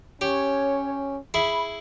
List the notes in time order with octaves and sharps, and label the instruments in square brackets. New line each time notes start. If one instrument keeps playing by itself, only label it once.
[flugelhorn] C#4 [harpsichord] G4 [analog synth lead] C#5
[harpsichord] E4 G#4 [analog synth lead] B5